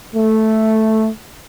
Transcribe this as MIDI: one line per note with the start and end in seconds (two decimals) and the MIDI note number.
0.14 1.07 57